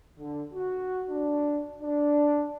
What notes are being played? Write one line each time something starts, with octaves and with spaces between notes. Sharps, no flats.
D3
F#4
D4
D4